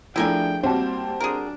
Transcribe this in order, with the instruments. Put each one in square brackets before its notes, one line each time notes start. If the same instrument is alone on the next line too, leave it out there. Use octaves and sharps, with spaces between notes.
[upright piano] F3 A3 D4 [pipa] E4 A#4 G#5 [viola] G#4 G5
[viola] G3 A#3 [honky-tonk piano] C4 [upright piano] F#4 G4 A5
[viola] D4 [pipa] G#4 A#4